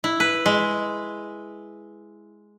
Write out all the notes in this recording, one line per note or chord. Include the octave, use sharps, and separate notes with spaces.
E4
B4
G#3